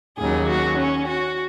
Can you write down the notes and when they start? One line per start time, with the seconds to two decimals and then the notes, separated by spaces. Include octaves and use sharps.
0.18 D#2 C#3 F#3 G#4
0.48 F#4
0.78 C#4
1.07 F#4